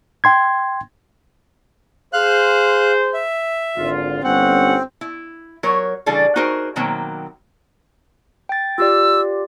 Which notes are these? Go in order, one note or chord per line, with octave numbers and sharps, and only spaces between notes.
G5 C6 G#6
G#4 C5 F5 F#6
E5
G#1 D3 F4
G1 C4 C#4 F#5
E4
F#3 A#4 C#5
C#3 E3 G3 D4 G#4 A4
D#4 F#4 G#4 A#4 C5
B2 D#3 F#3 A#3 C4
G5 A6
F4 G4 D5 E6